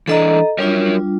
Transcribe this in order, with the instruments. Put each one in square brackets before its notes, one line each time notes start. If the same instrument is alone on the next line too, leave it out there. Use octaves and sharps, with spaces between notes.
[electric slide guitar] E3 D4 [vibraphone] A4 D#5 A#5
[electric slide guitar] F#3 A#4 C#5 [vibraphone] G3 D4 F4